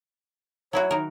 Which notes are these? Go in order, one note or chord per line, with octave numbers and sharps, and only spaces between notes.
F#3 E4 F#4 C#5
D#3 A#4